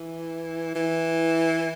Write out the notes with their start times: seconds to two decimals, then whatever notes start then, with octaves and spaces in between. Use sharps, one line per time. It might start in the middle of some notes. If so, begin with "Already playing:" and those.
Already playing: E3
0.75 E3